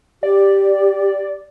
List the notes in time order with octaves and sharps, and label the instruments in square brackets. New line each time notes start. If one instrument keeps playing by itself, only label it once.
[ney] G4 [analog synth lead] D5